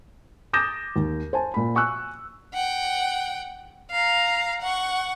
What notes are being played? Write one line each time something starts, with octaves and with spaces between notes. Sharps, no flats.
D6 D#6 G6 A6 A#6 E7
D#2
C5 G#5 A5
A#2 B5
G#5 C#6 E6 F#6
F#5 G5
F5 A#5
F#5 C#6